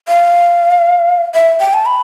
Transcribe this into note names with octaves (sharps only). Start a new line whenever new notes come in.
F5
E5
G5
A5
B5